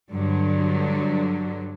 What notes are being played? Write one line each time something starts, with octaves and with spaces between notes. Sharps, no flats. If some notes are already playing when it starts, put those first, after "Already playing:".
G2 D3 F#3